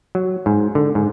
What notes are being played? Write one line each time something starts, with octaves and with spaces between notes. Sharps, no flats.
F#3
G#2
D3
G#2